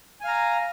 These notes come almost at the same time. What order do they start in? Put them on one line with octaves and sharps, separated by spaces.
G#5 F5 A#5